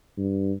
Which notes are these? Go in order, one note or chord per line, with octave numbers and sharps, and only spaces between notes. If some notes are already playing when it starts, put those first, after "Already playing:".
G2